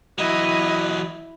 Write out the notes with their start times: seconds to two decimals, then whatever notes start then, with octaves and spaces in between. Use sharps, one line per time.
0.18 E3 F#3 E4 D#5